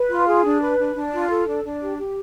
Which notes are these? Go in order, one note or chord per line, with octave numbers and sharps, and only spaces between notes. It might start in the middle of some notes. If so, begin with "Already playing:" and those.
Already playing: B4
F4
G#4
D4
B4
D4
D4
F4
A4
D4
D4
G4
G4